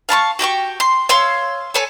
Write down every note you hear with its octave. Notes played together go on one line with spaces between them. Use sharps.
F5 A5 B5 C#6
F#4 G4 G5 C#6
C6
C#5 F5 C6 E6
A4 C#5 G#5